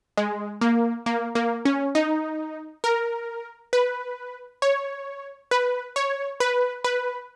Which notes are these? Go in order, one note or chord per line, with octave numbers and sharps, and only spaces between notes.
G#3
A#3
A#3
A#3
C#4
D#4
A#4
B4
C#5
B4
C#5
B4
B4